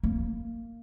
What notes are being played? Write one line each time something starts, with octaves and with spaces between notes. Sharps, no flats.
A#3